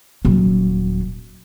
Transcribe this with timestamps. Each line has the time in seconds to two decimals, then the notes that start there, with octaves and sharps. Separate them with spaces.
0.25 D#1 F#3